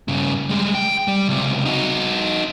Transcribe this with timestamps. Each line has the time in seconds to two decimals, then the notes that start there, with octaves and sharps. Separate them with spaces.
0.08 G2 C#3
0.49 G3 G#3
0.74 G5
1.08 G3
1.28 C#2 C3
1.65 D#4 F#4